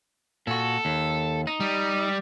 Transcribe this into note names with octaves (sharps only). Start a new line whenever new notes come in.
A#2 F#4 A4
D#2
D#4
G3